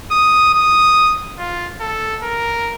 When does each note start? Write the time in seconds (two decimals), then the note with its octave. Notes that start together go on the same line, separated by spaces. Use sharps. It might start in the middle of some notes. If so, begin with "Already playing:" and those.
0.11 D#6
0.54 D#6
1.38 F4
1.80 A4
2.23 A#4